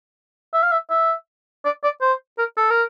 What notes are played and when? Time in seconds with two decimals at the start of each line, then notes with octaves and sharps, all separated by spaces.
0.54 E5
0.63 F5
0.72 E5
0.90 E5
1.65 D5
1.84 D5
2.01 C5
2.38 A#4
2.57 A4
2.70 A#4